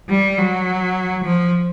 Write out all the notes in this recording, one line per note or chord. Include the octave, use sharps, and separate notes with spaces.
G3
F#3
F3